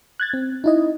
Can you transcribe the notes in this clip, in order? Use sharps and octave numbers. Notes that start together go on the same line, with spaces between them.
F#6 G#6 A6
C4
D#4 E4 D#5